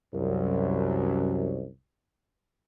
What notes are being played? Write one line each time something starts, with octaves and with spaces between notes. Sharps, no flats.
C2 F#2